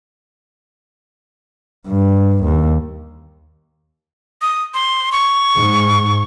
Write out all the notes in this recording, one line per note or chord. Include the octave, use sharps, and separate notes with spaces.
G2
D#2
D#6
C6
C#6
G#2